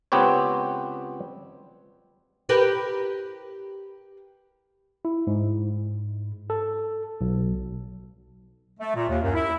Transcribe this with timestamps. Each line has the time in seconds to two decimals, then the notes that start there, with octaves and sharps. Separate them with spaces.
0.12 C#2 B3 C4 G4 B4 C#5
2.49 G4 A#4 B4
5.05 E4
5.27 G#2
6.50 A4
7.21 B1
8.79 A3
8.95 A#2
9.08 D#2
9.23 F#2
9.35 E4